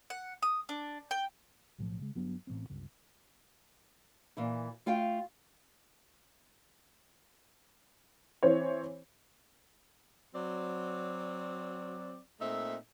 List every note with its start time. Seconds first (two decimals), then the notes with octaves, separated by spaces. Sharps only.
0.10 F#5
0.42 D#6
0.69 D4
1.11 G5
1.78 B1 A2 F3
2.00 C#3 G#3
2.15 G1 F#3 B3 D4
2.47 A1 E3 B3 C4
2.70 G1 C#2
4.37 A#2 E3 E4
4.86 A3 F4 F5 G5
8.43 E3 C4 C#5
10.34 F#3 C4 D5
12.40 A#2 A3 C4 D#4 A4 E5